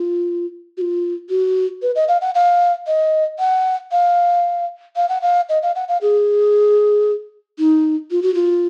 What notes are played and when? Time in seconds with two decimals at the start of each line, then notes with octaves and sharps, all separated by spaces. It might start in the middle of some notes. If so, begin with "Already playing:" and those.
Already playing: F4
0.77 F#4
0.81 F4
1.29 F#4
1.82 B4
1.95 D#5
2.08 F5
2.21 F#5
2.35 F5
2.87 D#5
3.39 F#5
3.91 F5
4.96 F5
5.09 F#5
5.22 F5
5.49 D#5
5.62 F5
5.75 F#5
5.88 F5
6.01 G#4
7.59 D#4
8.11 F4
8.22 F#4
8.34 F4